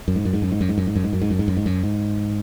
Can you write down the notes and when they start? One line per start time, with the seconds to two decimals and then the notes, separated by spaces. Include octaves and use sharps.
0.08 F#2
0.16 G#2
0.25 F#2
0.33 G#2
0.42 F#2
0.52 G#2
0.61 F#2
0.69 G#2
0.78 F#2
0.87 G#2
0.95 F#2
1.04 G#2
1.13 F#2
1.22 G#2
1.30 F#2
1.39 G#2
1.48 F#2
1.57 G#2
1.66 F#2
1.83 G#2